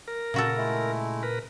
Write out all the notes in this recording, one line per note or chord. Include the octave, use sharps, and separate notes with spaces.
A#4
A#2 C#3 F#4 A4
G#3 A3 E4
A#4 B4